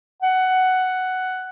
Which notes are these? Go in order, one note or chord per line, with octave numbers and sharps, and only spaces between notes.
F#5